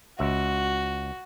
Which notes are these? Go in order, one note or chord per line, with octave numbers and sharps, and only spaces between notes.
C#2 F#4 E5